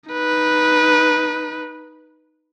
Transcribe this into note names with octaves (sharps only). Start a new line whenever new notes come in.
D#4 B4